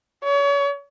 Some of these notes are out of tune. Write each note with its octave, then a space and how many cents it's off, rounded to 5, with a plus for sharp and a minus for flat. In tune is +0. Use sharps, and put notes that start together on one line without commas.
C#5 +35